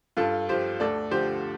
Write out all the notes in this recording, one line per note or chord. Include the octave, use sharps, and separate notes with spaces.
G2 F4 A4
F3 G4 C5
D2 A4 D5
D3 F3 G4 C5